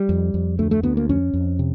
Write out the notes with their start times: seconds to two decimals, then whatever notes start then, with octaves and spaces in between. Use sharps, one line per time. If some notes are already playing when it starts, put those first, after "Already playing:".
Already playing: G3
0.09 F2
0.34 F2
0.59 D2 A3
0.71 A3
0.83 D2 B3
0.97 A#3
1.09 F2 C#4
1.34 F2
1.59 C3